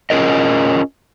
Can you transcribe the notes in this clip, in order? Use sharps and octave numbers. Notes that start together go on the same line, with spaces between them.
C#4 F4 G#4 A#4 D#5